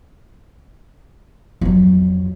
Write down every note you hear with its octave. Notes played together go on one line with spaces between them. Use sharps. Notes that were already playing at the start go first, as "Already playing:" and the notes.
F2 F#3